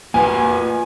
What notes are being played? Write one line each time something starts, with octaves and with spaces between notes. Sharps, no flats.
A#3 F4 B4 G#5